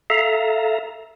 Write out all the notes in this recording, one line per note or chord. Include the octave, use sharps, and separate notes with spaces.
A4 E5 F5 A#5